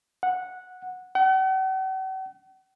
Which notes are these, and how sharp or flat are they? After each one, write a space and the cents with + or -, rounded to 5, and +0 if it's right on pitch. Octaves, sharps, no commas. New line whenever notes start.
F#5 -10
F#5 +45